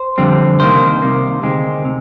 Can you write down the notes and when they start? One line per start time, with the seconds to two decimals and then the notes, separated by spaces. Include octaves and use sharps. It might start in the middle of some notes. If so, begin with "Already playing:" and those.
Already playing: C5
0.18 F2 D3 G3 C4
0.60 C2 C3 D#3 A#3 C5
1.02 C2 C3 D#3 A#3
1.43 D2 C3 D#3 G#3 C4
1.85 C3